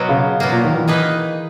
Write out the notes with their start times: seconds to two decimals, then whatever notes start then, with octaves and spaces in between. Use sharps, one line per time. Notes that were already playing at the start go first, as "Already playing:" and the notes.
Already playing: B2 F#3 A#3
0.09 C#3
0.40 B2 F#3 A#3
0.52 A#2
0.64 D#3
0.76 E3
0.88 D#3 A#3 D#4 G#4 B4